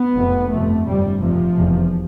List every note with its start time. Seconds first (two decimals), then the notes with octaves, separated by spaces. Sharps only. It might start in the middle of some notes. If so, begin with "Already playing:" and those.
Already playing: B3
0.16 F1 F2 C3
0.51 G1 F2 C3 A3
0.86 G1 F2 C3 G3
1.21 F1 F2 C3 F3
1.56 F1 E2 C3